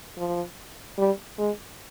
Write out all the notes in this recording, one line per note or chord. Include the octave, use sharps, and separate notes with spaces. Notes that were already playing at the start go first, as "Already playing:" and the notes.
F3
G3
G#3